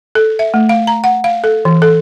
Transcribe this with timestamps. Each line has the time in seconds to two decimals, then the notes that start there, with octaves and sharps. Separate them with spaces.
0.15 A4
0.39 E5
0.54 A3
0.69 F5
0.87 A#5
1.04 F#5
1.24 F5
1.44 A4
1.65 E3
1.82 A4